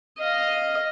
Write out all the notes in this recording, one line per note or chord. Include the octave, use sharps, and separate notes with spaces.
D#5 F5